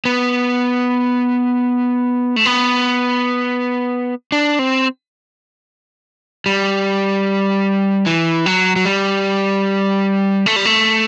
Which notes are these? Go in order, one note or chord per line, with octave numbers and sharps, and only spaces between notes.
B3
A3
B3
D4
C4
G3
E3
F#3
F#3
G3
A3
G3
A3